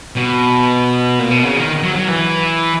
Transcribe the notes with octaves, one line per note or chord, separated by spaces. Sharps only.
B2
A#2
B2
C#3
D#3
F#3
F#3
E3